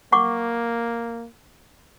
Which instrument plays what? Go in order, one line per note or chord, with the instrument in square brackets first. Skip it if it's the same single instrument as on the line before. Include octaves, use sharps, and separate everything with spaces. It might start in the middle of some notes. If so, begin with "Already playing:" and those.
[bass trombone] A#3 [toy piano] F#5 C#6 D6